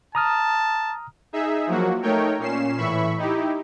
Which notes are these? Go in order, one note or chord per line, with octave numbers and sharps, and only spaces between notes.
A5 A#5 D#6 F6
D#4 G#4 E5
F3 F#3 A#3 F#4
A3 D#4 A#4 C#5 G5
A#2 C#4 C7 E7
A2 E3 E5 B5 C#6
D#4 E4 G4